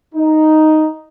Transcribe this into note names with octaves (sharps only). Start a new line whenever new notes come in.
D#4